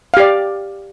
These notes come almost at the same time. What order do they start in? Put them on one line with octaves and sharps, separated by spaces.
F5 G4 D5